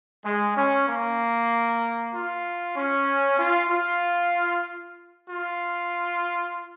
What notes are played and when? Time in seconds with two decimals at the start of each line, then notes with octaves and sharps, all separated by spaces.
0.24 G#3
0.57 C#4
0.88 A#3
2.14 F4
2.77 C#4
3.39 F4
3.70 F4
5.29 F4